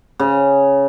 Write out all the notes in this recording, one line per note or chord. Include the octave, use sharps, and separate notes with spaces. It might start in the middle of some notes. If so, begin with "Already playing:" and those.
C#3